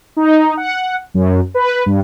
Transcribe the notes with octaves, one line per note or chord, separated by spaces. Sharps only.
D#4
F#5
F#2
B4
G2